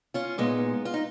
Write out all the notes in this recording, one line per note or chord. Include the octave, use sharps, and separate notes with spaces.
C#4 F4
A#2 G#3 B3 D#4
F4
D#4